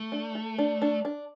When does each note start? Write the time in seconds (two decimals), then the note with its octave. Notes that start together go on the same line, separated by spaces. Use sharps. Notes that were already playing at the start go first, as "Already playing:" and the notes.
Already playing: A3
0.12 D4
0.35 A4
0.58 D4
0.82 D4
1.05 D4